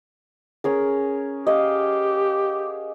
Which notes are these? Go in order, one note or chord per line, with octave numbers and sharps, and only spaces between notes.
C#4 G#4 A#4
G4 D#5 F5 F#5